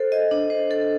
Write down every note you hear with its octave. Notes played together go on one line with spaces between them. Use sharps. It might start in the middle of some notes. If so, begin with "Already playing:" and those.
Already playing: A4 C5
D#5
D4
C5
A4